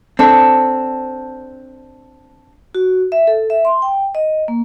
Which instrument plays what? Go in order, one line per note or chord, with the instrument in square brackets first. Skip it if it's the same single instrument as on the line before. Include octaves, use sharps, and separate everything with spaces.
[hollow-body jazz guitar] C4 D4 A4
[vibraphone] F#4
E5
A4
E5
C6
G5
D#5
A#3